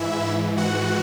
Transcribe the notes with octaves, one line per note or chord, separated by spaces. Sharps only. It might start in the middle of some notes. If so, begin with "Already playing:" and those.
Already playing: G#2 E3 E4 E5
F#4 F#5